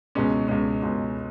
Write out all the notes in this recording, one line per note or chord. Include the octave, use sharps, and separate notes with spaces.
C#2 B2 G#3 C#4
C#2 B2 G#3 C#4
C#2 B2 G#3 C#4